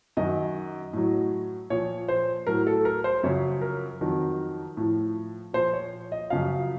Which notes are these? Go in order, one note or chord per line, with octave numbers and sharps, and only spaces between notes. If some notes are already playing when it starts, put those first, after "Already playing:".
F#2 D#3 F#3 D#5
A2 F#3
A#2 F3 C#5
C5
A2 F#3 A#4
A4
A#4
C5
F#2 C#3 F3 C#5
A#4
F2 D#3 F#3
A2 F3
A#2 F3 C5
C#5
D#5
F#2 C#3 F3 F5